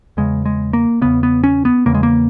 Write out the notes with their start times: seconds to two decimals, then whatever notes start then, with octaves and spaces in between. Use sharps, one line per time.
0.17 E2 C#3 G#3
0.46 G#3
0.73 A#3
1.01 E2 C#3 B3
1.23 B3
1.44 C#4
1.65 B3
1.86 E2 C#3 A#3
1.95 G#3
2.03 A#3